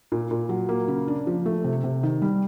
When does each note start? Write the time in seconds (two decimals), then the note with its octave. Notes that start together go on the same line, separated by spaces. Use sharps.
0.12 A#2
0.31 A#2
0.49 F#3
0.69 A#3
0.88 C#3
1.08 D4
1.27 F3
1.46 A3
1.64 C3
1.84 C3
2.03 D#3
2.22 G3